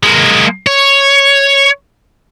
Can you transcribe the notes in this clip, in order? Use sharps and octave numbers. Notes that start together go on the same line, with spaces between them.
G#3 A#3
C#5